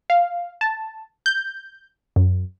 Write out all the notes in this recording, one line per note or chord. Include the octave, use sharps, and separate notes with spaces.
F5
A5
G6
F#2